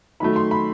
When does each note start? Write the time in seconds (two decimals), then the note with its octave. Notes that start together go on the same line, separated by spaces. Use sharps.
0.20 D#3 F#3 A3 B5
0.36 C6
0.51 B5